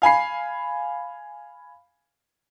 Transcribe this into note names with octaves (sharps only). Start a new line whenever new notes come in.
F5 G#5 B5 C7